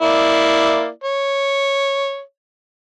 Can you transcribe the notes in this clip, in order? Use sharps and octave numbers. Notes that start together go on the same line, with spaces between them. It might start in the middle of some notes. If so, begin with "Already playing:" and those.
A#3 E4 D5
C#5